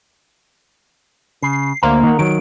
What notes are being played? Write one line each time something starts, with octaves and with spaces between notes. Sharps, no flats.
C#3 C7
D2 A#3 A#4 C5 F5
D#3 F#5
D#3 F#3 D7